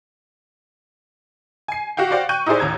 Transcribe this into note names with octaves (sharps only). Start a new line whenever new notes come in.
G#5 C7
F#4 G4 F5 G5
F#4 C5 D5 F5 G5
G5 C#6 F#6 G6 D#7
D#4 E4 G4 G#4 C5 D5
A1 D#2 A#5 G#6